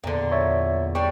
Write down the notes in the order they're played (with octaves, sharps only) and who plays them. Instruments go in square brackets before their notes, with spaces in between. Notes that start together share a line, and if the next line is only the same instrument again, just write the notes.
[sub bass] E2 [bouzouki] A#2 D3
[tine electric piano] C#5 E5
[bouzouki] G3 D4 [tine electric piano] C#6